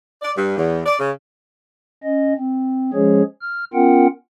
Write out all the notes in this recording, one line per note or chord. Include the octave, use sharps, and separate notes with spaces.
D5
G2
E2
D5
C#3
C#4 D#5
C4
F3 G#3 C#4 G#4 C#5
F6
B3 C#4 F4 A#4 F#5 G5